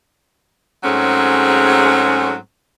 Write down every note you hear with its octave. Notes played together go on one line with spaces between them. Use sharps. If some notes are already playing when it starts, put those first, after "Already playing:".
G#2 F#3 A3 C4 C#4 G#4